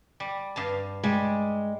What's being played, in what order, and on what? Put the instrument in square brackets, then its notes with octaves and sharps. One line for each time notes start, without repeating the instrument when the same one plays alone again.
[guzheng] G3
G2 F5 A5
[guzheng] G3 [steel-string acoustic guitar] G#3